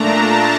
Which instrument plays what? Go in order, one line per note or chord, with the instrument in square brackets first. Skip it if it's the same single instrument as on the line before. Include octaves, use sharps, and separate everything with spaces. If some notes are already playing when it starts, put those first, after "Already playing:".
Already playing: [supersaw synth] A#2 A3 D4 A5 A#5